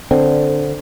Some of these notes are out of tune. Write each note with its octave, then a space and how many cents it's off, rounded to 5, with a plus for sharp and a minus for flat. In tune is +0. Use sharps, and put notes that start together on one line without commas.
D3 +0 C4 +0